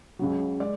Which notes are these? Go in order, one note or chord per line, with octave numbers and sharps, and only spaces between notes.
C#2 C#3 F#3
G#3 D5